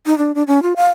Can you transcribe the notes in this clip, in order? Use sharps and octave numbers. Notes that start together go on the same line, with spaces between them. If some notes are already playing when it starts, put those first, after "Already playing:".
D#4
D4
D4
C#4
F4
F5